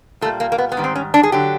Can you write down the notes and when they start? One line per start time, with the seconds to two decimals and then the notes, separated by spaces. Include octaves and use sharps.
0.21 A#2 G3 A3
0.40 A#3
0.52 A#3
0.58 B3
0.72 B3
0.77 G#2 D#3 G3
0.84 C4
0.96 C#4
1.14 D4
1.23 G#4
1.32 D3 F#3 G4